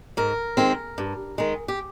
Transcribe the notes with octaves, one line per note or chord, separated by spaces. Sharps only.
G#2 A#4
D#3 G#3 C4
G2
D#3 G#3
G4